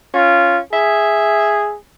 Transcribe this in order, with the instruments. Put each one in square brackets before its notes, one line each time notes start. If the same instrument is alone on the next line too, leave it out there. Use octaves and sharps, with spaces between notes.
[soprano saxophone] C#4 [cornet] F4
[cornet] G#4 [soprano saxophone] E5